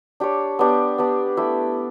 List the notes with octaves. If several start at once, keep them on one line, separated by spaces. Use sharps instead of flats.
D4 G4 C#5
B3 D4 G4
B3 D4 G4
A3 E4 G4